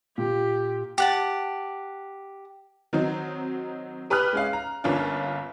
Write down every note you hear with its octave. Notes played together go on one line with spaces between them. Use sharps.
A#2 G4
G4 F#5 A5
D#3 F#3 C4 D#4
G4 B4 B5 D#6 F6 F#6
G#3 C#4 F5
A#5
G1 A#3 C#4 D4 F4